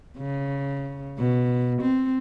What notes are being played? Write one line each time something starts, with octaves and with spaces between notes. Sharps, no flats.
C#3
B2
C4